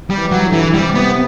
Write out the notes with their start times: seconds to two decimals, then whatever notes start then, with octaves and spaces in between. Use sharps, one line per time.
0.10 G3
0.17 E3
0.32 F#3
0.47 D3
0.53 E3
0.74 C3 G3
0.95 B3